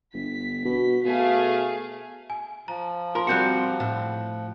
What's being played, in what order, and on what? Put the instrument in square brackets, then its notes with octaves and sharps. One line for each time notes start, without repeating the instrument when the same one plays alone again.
[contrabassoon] G1 [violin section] B6
[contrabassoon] B2
[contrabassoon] B2 [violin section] A3 G#4 F5
[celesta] G#5
[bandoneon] F3 [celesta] A#5
[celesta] F4 C6 [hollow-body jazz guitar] A#4
[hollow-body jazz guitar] G3 C4 F#4 [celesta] F#6 G6 C#7
[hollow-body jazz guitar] A2